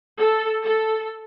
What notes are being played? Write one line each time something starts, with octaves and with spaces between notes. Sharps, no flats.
A4
A4